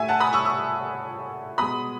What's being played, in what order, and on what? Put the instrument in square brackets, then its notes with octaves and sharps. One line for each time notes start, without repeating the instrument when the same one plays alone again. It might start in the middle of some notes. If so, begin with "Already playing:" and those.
Already playing: [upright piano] A2 A3 E5 G#5
F#5 A5
B5 D#6
C#6 E6
C#6 E6
B2 G#3 B5 D#6